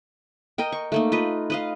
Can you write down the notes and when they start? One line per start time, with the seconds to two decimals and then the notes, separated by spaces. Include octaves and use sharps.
0.58 A#4 D#5 G5
0.72 C#6
0.92 A3 A#3 D#4
1.12 F4 B4 D#5
1.50 B4 D#5 F5